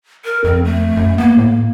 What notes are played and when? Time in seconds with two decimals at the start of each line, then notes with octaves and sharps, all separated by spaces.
0.25 A#4
0.44 F2 C4
0.64 A3
0.97 F#2
1.18 A#3 B3
1.37 A2